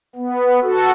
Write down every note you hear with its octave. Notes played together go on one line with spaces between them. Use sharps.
B3
F#4 A4